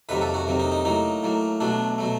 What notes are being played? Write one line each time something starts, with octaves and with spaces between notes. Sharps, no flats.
F2 C3 D#3 F#3 A#3 B4
A4
F#4
F2 C3 D#3 F#3 A#3
D#4
D#4
A2 F#3 A#3 D#4
A2 F#3 A#3
B2 F#3 A3 D4
B2 F#3 A3